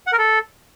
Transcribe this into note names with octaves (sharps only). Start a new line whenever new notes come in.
F#5
A#4
A4